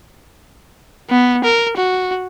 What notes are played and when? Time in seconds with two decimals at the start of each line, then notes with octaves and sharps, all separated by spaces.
1.10 B3
1.44 A#4
1.77 F#4